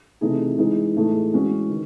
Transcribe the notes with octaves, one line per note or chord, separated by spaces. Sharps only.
C3 E3 A3 D#4 G#4
E3 G#3 D#4 G#4
A2 E3 A3 D#4 G#4
E3 G#3 C#4 F#4
D#3